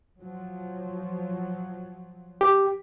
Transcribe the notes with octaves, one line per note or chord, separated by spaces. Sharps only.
F3 F#3
G4